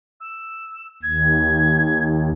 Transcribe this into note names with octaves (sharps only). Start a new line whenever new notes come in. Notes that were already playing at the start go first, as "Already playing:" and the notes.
E6
D#2 G#6